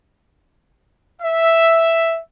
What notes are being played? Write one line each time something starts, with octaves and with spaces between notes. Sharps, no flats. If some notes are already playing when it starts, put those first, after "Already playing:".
E5